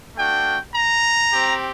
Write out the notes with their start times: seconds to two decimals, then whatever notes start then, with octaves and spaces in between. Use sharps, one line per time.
0.16 A3 D4 F#4 G5
0.74 A#5
1.32 C4 G4